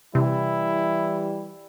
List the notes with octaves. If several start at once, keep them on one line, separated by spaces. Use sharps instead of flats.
C3 E3 G3 E4